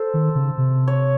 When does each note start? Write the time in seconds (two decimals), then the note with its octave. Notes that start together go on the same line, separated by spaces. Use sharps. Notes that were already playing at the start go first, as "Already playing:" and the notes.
Already playing: A4 C5
0.14 D#3
0.35 C#3
0.58 C3
0.88 C#5